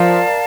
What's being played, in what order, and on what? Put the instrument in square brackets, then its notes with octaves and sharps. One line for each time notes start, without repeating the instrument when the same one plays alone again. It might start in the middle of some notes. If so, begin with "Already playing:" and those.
Already playing: [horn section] F3 [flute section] A#4 D5 F5 A5